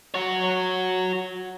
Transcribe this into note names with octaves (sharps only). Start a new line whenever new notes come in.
F#4 C#5